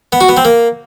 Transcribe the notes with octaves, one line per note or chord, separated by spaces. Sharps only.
B3
F#4
B3
C4
A#3